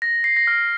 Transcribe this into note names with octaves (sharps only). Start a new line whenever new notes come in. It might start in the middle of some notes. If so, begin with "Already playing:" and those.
A#6
C7
A#6
F6